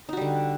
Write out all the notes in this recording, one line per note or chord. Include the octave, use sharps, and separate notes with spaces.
D3 G3 D#4 F#4